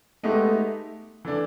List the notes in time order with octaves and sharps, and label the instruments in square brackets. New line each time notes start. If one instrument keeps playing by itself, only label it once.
[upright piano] G#3 B3 D#4 G4 [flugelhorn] A3
[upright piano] E3 A3 D4